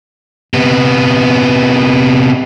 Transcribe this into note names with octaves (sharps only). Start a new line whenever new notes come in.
C3 B3